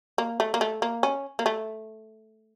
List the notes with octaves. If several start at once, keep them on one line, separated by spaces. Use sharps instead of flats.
A#3
A3
A#3
A3
A#3
C#4
A#3
A3